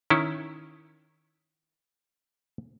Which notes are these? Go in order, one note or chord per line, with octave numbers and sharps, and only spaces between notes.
D#3 C#4 E4